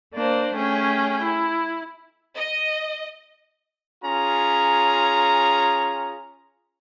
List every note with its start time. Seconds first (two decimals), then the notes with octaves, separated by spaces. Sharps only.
0.13 A#3 D4 C5
0.55 A3 C#4 G#4 G5
1.21 E4
2.36 D#5
4.04 C#4 F4 G#4 A#5